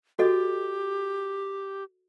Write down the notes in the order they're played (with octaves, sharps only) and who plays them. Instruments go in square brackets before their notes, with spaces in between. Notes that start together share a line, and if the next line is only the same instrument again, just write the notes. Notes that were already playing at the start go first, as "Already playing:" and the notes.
[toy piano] F#4 A4 D#5 [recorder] G4